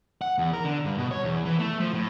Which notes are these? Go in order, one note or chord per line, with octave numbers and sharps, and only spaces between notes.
F#5
E2
A#4
D3
G2
B2
C#5
E2
E3
A3
F3
A2